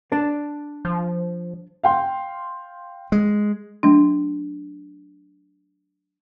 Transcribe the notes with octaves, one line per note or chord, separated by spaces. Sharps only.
D4 D5 A5
F3
F5 G5 C6
G#3
F#3 A3 D4